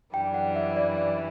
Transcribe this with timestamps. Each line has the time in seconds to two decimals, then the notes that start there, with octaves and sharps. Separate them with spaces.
0.13 F#2 E3 G3 D4 G5
0.34 F#5
0.56 E5
0.76 D5
0.98 E5